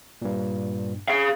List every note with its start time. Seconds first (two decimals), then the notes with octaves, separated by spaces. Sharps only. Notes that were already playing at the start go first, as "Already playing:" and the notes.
0.22 G2 A#2
1.08 G#4 F5